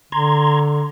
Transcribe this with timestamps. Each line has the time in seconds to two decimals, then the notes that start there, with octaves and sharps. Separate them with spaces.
0.12 D3 A#5 C6 G#6